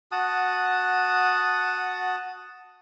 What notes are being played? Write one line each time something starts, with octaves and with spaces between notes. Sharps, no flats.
F#4 F#5 A5 D#6